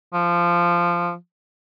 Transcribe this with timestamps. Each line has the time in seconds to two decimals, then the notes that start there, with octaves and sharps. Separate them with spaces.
0.14 F3